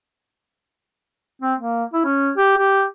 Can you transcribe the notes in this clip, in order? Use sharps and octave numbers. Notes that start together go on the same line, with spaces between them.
C4
A#3
E4
C#4
G4
G4